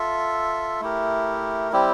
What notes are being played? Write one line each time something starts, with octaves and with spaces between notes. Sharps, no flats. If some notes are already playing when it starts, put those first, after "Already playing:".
Already playing: F4 A4 E5
A3 E4 G4 A#4
G3 C4 E4 G4